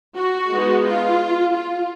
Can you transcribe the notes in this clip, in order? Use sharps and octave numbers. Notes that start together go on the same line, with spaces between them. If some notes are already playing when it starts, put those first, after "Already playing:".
F#4
G#3 B3 D#4
F4
F4